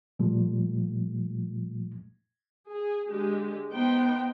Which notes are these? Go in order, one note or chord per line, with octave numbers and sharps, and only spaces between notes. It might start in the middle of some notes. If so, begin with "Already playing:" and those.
A#2 F3 G3 A3
G#4
D3 G#3 G4
B3 D#4 C5 G5